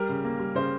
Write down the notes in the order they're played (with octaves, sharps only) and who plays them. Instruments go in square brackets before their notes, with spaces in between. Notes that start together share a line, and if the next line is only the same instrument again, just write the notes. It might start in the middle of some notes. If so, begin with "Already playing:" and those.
Already playing: [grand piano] G3 A#4
C#3
A#3
G3
C#3 C5